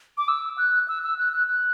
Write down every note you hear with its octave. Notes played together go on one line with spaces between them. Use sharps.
D6
E6
F#6
E6
E6
F#6
F#6
F#6